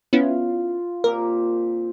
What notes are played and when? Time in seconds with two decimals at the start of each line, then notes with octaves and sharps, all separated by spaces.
0.13 B3 C#4 E4 F4
1.04 A#2 C4 G4 A#4